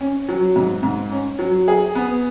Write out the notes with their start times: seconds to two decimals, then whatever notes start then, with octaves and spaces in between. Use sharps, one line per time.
0.01 C#4
0.29 F#3
0.56 G#2
0.83 G#2
1.12 C#4
1.39 F#3
1.68 G#4
1.95 B3